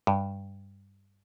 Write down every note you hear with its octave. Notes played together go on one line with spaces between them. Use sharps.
G2